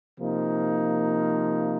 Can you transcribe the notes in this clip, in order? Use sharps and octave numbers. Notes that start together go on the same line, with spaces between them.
C3 F3 A#3 D#4